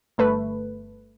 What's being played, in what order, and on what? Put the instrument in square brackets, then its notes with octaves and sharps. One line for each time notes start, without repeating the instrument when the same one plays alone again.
[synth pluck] G1 A3 B4